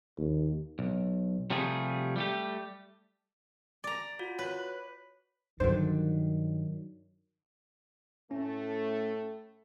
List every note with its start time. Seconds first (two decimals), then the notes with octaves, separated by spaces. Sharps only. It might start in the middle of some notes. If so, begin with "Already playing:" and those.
0.18 D#2
0.79 B1
1.50 C3 F3 G3 A3 G#4
2.16 G3 A3 G4
3.84 D5 A#5
4.19 F4 F#4
4.39 B4 C#5 F#6
5.60 G2 D3 D#3 F#3 D4 C5
8.31 A2 A3 C#4